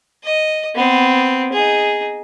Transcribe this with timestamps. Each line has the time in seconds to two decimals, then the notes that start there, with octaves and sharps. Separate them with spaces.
0.24 D#5
0.76 B3 C4
1.53 D#4 G#4